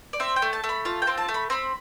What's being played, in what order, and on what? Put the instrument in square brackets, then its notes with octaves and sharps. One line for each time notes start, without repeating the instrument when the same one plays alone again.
[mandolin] D5
C4 E5
G5
A3
A5
A3
B5
F4 A5
G5
C4
A5
A3
B5
C4 B5